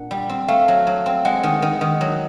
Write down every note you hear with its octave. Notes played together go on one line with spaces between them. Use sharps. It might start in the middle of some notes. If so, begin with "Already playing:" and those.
Already playing: A#2 D4 F#5
G3
C4
A3 F5
F#3
F#3
C4
G#3 F#5
D#3
D#3
D#3
F#3